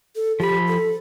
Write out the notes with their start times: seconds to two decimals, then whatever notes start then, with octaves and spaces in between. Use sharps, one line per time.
0.16 A4
0.40 F3 G4 B5
0.68 A4